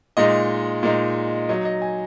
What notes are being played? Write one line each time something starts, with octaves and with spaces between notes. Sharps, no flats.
A#2 G#3 D#4 D#5
A#2 G#3 D#4
F#3 D#4 D#5
D#5
G#5